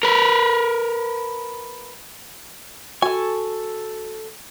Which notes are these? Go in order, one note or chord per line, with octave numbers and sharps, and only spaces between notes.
A#4 B4
F#4 A4 G#5 C#6